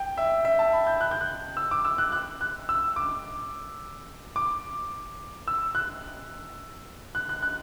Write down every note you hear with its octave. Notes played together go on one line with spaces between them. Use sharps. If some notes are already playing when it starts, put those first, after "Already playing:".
Already playing: G5
E5
E5
A5
B5
G6
F#6
G6
F#6
E6
D6
E6
F#6
F#6
F#6
E6
D6
D6
E6
F#6
F#6
F#6
F#6